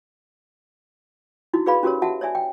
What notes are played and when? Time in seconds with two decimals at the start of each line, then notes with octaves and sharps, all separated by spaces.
1.53 D#4 E4 F#4
1.66 F#4 G#4 B4 D5 F5 B5
1.83 C#4 F#4 G4 A#4 C#5
2.02 F#4 E5 F#5 A5
2.21 C#5 D5 E5 G#5
2.35 G5